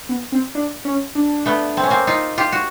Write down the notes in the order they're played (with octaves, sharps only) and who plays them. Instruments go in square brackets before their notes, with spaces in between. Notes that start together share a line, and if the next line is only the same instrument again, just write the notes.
[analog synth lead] B3
C4
D4
C#4
D4
[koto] A3 B3
C4
C#4
A#3 C4
D#4 F4
F4 G4
F#4